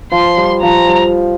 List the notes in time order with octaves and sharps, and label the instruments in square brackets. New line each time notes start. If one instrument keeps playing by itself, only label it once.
[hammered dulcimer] F3 [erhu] C6
[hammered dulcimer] G3
[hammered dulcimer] F3 [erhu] A#5
[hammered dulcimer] G3